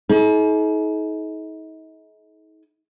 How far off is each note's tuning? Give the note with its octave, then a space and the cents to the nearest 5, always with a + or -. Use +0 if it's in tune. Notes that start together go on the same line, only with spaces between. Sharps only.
D#4 +40 G#4 +45